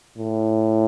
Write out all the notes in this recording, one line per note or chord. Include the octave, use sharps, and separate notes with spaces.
A2